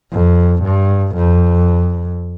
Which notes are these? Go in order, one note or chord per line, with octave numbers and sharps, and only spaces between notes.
F2
G2
F2